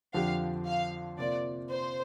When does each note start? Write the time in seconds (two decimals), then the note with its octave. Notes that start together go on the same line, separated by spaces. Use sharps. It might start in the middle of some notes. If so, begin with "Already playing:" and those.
0.14 F2 D3 F3 D4 G4 F5
0.66 F5
1.18 C3 A#3 F4 D5
1.71 C5